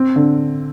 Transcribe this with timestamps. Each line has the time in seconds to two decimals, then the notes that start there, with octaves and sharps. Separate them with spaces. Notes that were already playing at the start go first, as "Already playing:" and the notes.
Already playing: C4
0.16 D3